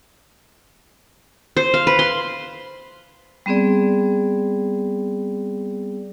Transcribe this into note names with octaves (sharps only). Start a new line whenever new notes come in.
C5
F5
B4
C6
G3 B3 C4 G#4 D5